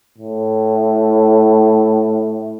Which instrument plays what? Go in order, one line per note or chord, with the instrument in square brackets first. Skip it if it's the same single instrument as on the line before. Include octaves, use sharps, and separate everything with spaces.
[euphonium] A2